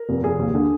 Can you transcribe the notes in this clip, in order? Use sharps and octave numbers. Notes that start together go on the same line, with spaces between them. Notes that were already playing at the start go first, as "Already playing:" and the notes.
Already playing: A#4
F1
F1 G#4
D#2
D3